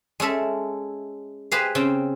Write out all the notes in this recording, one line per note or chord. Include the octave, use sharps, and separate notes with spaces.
G#3 C#4 A4 E5
G4 G#4 B4 C5 F5
C#3 C4 G5